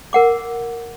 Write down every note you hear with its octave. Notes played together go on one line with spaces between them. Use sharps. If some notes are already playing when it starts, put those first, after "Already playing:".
A#4 F#5 D6